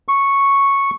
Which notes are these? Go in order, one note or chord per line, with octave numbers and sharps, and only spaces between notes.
C#6